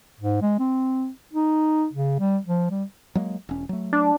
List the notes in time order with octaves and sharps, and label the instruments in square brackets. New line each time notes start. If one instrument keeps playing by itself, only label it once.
[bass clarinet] G#2
G#3
C4
D#4
C#3
G3
F3
G3
[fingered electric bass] F#3 G#3 A#3
E1 C#4
F#3 A3
[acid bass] D4